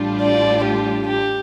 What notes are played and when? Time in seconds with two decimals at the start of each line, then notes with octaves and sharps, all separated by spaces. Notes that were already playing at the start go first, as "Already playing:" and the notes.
Already playing: A1 A2 G3 D4 F4
0.20 D5
0.64 G4
1.07 G4